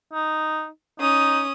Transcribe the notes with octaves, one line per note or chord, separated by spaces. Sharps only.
D#4
C#4 D#4 D#6